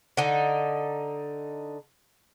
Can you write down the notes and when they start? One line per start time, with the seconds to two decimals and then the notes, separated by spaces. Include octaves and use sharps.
0.17 D3 D#4